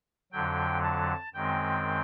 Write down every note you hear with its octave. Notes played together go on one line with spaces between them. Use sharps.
F2 D3 F#3 G5
A5
F#2 D#3 G#3 C4 G5